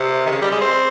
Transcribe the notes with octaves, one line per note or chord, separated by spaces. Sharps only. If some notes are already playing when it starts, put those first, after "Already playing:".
Already playing: C3
D#3
C#3
G3
G#3
C4